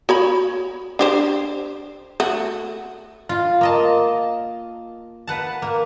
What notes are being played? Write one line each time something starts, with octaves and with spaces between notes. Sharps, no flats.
F#4 C#5 B5
D4 G4 C5
A3 F#4
F4
A#3 D#5 A5
B4 F#5 A5
A#3